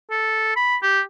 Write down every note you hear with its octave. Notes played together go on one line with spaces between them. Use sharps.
A4
B5
G4